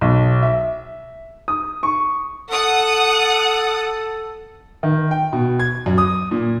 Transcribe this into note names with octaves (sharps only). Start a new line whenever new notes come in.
B1
E5
D#6
C#6
A4 F#5 D#6
D#3
G5
B2
G#6
F#2
D#6
A#2